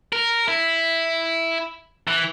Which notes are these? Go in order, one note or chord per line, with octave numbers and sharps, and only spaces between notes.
A#4
E4
E3